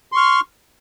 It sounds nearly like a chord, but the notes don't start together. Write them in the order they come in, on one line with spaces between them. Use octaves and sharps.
C6 C#6 F6